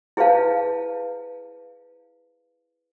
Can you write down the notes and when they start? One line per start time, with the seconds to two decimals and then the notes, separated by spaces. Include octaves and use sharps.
0.17 E4 G#4 B4 C5 F5 A5